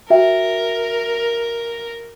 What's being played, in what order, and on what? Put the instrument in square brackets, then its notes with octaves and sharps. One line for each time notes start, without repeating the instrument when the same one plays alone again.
[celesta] F#4 E5 G5 [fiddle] A#4